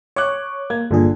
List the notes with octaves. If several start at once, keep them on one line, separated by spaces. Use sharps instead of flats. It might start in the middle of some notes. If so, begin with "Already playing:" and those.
C#5 C#6 D6 F#6
A#3 G#6
G1 A#2 D3 G#4